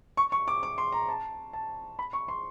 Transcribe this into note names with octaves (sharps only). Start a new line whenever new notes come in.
C#6
C#6
D6
D6
C6
A#5
A5
A5
B5
C#6
C6